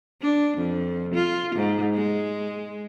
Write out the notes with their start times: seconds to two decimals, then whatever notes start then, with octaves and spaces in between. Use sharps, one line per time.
0.21 D4
0.57 F2
1.14 F4
1.55 G#2
1.95 G#3